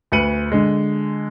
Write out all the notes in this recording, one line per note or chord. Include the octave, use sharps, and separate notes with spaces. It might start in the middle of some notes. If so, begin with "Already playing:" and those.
D2 B4 C#7 D#7 F#7
D3 G#3